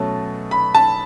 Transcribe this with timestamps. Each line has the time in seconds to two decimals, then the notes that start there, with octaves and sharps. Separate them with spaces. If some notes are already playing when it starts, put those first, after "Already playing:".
Already playing: B2 F#3 A3 C#4 A5
0.51 B5
0.75 A5